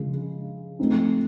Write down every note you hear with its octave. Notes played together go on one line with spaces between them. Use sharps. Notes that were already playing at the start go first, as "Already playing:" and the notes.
Already playing: C#3 F3 G#3
F3 A3 C4 D#4